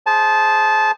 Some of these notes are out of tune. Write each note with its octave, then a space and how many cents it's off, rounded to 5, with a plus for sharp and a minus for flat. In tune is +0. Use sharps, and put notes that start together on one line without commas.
G#4 +0 C5 +0 A5 -20